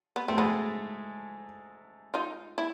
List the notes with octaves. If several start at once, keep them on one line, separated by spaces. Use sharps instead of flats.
B3
A3 C4
G#2 G#3 B3
D#4 F4
E4